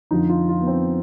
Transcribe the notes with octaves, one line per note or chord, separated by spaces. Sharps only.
F2 D3 F3 D#4
F4
F4
B3
C4